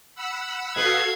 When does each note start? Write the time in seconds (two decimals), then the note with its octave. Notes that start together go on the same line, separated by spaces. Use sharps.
0.15 F#5 B5 E6
0.76 B2 B3 F#4 A4 B4 F5 G#6 C7